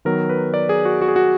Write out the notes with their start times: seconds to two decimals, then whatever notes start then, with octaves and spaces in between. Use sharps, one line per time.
0.05 D#3 F#3 B3 A#4
0.29 B4
0.54 D5
0.69 G#4
0.85 F#4
1.02 F#4
1.08 G#4
1.16 F#4